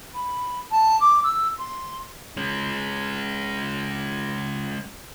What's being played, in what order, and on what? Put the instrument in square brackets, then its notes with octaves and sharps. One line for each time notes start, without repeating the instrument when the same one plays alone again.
[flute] B5
A5
D6
E6
C6
[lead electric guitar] G#3 C#4